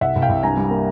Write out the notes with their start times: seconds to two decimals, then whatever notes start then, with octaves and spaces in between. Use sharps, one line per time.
0.01 C2 E5 F#5
0.16 C2
0.22 F5 G5
0.29 C2
0.43 G2 G#5 A#5
0.57 G3
0.71 A#3